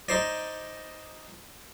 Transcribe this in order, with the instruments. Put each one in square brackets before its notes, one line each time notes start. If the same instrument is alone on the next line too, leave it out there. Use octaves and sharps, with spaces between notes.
[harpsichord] D#4 C5 D5